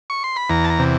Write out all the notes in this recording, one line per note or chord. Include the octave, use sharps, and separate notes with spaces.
C#6
C6
B5
E2 A#5
A5
A#5
C3